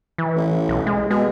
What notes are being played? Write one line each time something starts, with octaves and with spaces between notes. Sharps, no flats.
E3
A1
B1
G#3
B2 G#3